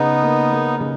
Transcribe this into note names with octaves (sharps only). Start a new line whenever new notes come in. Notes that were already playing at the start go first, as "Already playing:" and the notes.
Already playing: C#3 B3 D#4
A#3
A#3
C#3